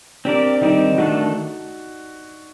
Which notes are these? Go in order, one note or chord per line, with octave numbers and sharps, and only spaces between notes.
C4 D4 G4 A#4 D5
D#3 G3 C4 D#4 G4
D#3 A3 D4 F#4 A4